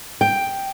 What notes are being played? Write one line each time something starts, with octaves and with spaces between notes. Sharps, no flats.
G5